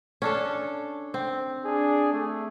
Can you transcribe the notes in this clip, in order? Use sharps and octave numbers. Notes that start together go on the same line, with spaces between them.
C#4 D4 A4
C4
D4 G#4
A3